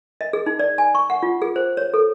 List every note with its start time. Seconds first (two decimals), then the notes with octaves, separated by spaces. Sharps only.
0.21 D#5
0.33 G#4
0.46 D#4
0.59 D5
0.78 G#5
0.95 C#6
1.10 F#5
1.23 F4
1.42 G#4
1.56 C5
1.77 C#5
1.94 A4